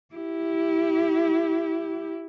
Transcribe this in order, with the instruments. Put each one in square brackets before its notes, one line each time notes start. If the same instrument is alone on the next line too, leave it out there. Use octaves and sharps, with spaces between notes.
[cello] E4 G4